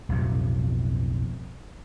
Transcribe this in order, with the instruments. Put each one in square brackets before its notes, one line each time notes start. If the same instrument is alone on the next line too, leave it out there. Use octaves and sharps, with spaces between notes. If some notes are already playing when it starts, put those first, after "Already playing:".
[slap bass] B1 F2 A2 C3